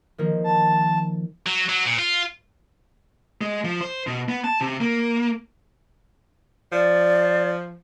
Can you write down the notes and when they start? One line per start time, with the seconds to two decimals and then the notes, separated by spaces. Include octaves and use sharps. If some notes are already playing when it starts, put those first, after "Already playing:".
0.18 D#3 F3 A#3
0.44 A5
1.47 F#3
1.69 F#3
1.86 A#2
1.99 F4
3.41 G#3
3.64 F3
3.81 C5
4.07 B2
4.29 B3
4.44 A5
4.61 C3
4.81 A#3
6.72 F3 D5